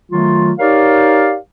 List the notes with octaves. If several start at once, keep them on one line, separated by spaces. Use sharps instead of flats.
D#3 F#3 A3 F4
D#4 G4 A#4 C#5 D5 F5